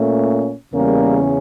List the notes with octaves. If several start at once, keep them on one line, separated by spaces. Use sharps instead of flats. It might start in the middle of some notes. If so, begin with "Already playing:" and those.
Already playing: A#2 A3 C#4
E2 C#3 G3 A#3 C#4 A#4